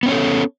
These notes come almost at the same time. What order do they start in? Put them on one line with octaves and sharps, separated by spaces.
B3 C#4 C#5 A4